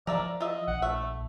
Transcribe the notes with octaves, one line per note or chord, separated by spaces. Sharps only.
F3 A#4 D5 E5 F5
F4 D#5 E5
A#1 F#5
A3 E5